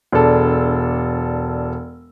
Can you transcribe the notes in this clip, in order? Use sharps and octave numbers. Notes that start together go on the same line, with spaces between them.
E1 D4 A4